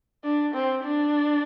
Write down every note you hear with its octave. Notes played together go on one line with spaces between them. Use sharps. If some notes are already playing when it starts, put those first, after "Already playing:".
D4
C4
D4